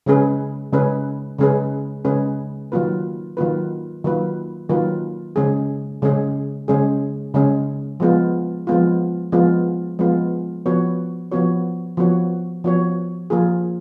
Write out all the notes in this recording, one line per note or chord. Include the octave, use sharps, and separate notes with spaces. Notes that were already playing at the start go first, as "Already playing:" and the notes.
C#3 G#3 C#4 G#4 B4
C#3 G#3 C#4 G#4 B4
C#3 G#3 C#4 G#4 B4
C#3 G#3 C#4 G#4 B4
D#3 F#3 A#3 F4 B4
D#3 F#3 A#3 F4 B4
D#3 F#3 A#3 F4 B4
D#3 F#3 A#3 F4 B4
C#3 G#3 C#4 G#4
C#3 G#3 C#4 G#4
C#3 G#3 C#4 G#4
C#3 G#3 C#4 G#4
F3 G#3 B3 F4
F3 G#3 B3 F4
F3 G#3 B3 F4
F3 G#3 B3 F4
F3 B3 F#4 C#5
F3 B3 F#4 C#5
F3 B3 F#4 C#5
F3 B3 F#4 C#5
F3 A#3 F4 G#4